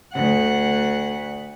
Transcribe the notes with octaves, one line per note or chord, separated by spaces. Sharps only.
D2 F#5